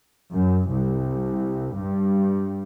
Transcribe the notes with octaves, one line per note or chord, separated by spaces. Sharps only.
F#2
C2
G2